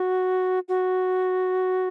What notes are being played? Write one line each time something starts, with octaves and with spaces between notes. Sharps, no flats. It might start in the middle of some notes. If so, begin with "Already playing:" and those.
Already playing: F#4
F#4